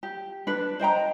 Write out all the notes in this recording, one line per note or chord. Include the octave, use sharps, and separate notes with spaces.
G4
D4 B4
C5 D#5 G5 A#5